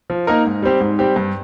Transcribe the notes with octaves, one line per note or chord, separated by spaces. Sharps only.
F3
A#3 D#4 A#4
G#2
G3 C4 G4
G#2
G3 C4 G4
G2